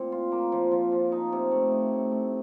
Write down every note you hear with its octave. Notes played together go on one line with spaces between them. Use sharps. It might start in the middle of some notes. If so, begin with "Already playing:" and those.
Already playing: A#2 C4
F4
A#3
F3
F3
F3
D#4
C3
A3
D#4
A2
A3